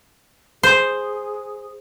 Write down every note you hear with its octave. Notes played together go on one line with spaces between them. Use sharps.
G#4 C5